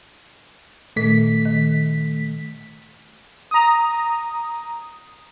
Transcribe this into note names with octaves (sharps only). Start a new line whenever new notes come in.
A#2 D#3 A3 B6
D#3
A#5 D#6